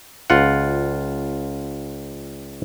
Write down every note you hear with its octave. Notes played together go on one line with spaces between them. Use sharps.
C#2 F4 F#5